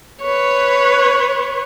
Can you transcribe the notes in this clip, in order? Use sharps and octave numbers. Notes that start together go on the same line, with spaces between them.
B4 C#5